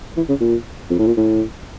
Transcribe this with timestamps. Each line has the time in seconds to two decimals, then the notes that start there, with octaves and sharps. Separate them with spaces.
0.17 E3
0.29 C#3
0.41 A#2
0.90 F2
0.99 A2
1.07 A#2
1.17 A2